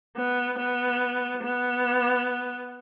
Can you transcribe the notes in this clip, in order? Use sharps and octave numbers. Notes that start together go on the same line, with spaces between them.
B3
B3
B3